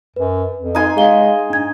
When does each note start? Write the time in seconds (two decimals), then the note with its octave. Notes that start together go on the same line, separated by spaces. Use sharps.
0.16 F#2 B4
0.58 F2
0.75 D#4 G#5 C6
0.97 G#3 G#4 F5 G7
1.50 G#2 D4 G#6